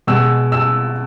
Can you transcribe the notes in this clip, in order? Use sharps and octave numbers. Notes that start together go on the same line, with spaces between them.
B2 G#3 E6
E6